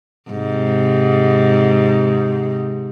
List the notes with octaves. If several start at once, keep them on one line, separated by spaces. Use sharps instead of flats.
G#2 C3